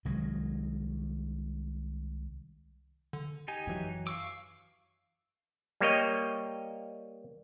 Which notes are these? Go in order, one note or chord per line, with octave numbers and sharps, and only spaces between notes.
C2 D#3 F#3 G#3
D3
D#4 G4 G#5
F#2 E3 F#3
F5 C#6 D6 E6
G3 A#3 C#5 D#5